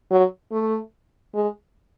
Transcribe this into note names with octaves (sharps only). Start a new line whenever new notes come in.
F#3
A3
G#3